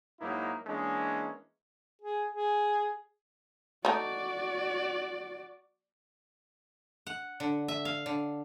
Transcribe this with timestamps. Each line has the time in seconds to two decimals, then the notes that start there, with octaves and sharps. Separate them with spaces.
0.20 G#2 F#3 A#3 D#4 E4
0.67 E3 G#3 A#3 C#4 D4
2.02 G#4
2.32 G#4
3.85 A3 D#4 F#4 D5
7.07 F#5
7.40 D3
7.68 E5
7.85 F5
8.06 D3